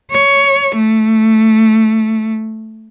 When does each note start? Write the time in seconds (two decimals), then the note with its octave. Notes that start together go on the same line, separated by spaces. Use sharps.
0.11 C#5
0.76 A3